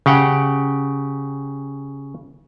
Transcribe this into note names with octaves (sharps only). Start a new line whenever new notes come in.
C#3 G4 F#5 G5